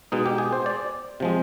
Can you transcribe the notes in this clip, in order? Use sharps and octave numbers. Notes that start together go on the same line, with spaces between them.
B2 G#3 D#4
G4
G#4
C5
D5
C3 F3 G#3